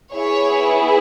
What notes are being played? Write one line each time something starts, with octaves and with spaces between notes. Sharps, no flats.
B3 E4 G#4 C#5